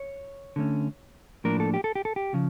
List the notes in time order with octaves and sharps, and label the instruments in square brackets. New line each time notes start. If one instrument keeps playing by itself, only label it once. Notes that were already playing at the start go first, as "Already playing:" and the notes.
Already playing: [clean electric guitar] C#5
D3 A3 C#4
A2 F3 A#3 D4 A#4
A4
G4
A4
G4
A4
G4
C#3 F3